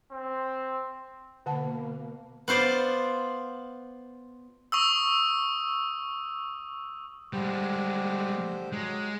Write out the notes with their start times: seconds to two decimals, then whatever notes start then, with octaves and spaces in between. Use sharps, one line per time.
0.10 C4
1.46 B2 D3 A#3 F#5 A5
2.48 B3 F4 C5 D5
4.72 C#6 D#6 E6
7.33 D3 G3 G#3 G4 C5
8.72 F#3 G#3